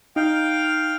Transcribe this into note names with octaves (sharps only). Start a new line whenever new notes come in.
D#4 F5 G5